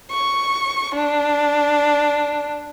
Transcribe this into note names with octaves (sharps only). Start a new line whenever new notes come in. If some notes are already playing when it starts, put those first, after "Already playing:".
C#6
D4